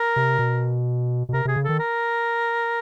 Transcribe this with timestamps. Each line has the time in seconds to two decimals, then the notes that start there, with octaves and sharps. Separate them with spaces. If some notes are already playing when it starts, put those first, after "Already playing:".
Already playing: A#4
0.16 C3
0.39 B2
1.29 B2
1.33 C3 A#4
1.45 C3 G#4
1.56 C#3
1.64 D#3 A4
1.79 A#4